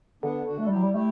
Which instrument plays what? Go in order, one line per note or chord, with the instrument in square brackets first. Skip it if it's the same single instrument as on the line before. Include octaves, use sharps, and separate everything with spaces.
[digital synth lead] D3 [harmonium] B3 D4
[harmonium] D4 F#4
[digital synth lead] A3
[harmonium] A4
[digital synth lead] G3
[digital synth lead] F#3 [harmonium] E4 G4
[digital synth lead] G3
[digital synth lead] A3 [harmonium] E4 G4